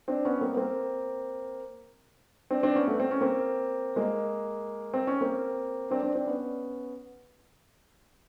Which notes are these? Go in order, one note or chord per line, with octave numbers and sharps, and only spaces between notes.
C4 D4
B3 C#4
A#3 C4
B3
A#3 C4
C4 D4
C4 D4
B3 C#4
A3 B3
C4
C#4
A#3 C4
G#3 A#3
C4
C#4
A#3 C4
C4 D4
C4 D4
C4 D4
B3 C#4